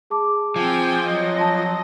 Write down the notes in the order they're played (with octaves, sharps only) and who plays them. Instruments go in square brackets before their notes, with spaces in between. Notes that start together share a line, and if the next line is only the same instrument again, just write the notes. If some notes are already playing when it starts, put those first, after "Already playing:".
[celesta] G#4 A5 D6
[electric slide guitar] F3 [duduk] C4 [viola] G5 G#5
[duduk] F#3 [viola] D#5
[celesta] A5 C6 A#6